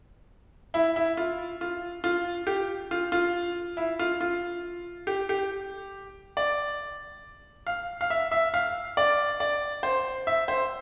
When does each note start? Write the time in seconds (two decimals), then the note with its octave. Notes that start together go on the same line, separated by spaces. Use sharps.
0.74 E4
0.96 E4
1.17 F4
1.61 F4
2.04 F4
2.47 G4
2.91 F4
3.12 F4
3.77 E4
3.99 F4
4.21 F4
5.07 G4
5.29 G4
6.37 D5
7.67 F5
8.01 F5
8.10 E5
8.32 E5
8.54 F5
8.97 D5
9.40 D5
9.83 C5
10.27 E5
10.48 C5